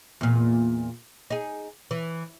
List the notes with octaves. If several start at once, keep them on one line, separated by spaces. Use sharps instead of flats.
E2 A#2
D#4 G#4
E3